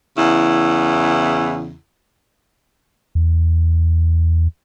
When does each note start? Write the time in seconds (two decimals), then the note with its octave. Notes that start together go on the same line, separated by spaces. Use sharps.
0.18 E2 C#3 E4
3.15 E2